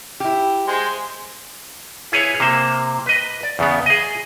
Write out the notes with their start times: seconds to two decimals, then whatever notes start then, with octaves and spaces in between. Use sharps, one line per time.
0.20 E4 G4
0.67 G#3 C5 G#5
2.12 E4 G#4 B4 C#5
2.40 C3 A#3 C5
3.06 B4 D#5
3.43 D5
3.59 E2 C#3 B3
3.86 G#4 D#5